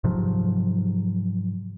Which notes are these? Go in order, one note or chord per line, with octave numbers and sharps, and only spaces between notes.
G#2 C3 F3 F#3